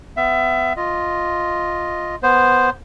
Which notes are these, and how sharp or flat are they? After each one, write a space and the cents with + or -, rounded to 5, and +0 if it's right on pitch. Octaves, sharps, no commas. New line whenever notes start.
B3 +30 E5 +25
F4 +0 D#5 +0
B3 +0 C5 +0